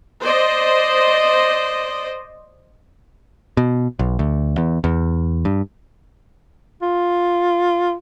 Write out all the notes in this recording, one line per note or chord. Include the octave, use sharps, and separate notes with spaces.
C5 D5 D#5
B2
B1
D2
E2
E2
G2
F4